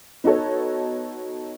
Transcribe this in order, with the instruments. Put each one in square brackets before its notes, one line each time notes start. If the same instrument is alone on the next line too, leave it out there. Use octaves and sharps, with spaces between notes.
[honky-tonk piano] B3 D#4 F#4 A4 C#5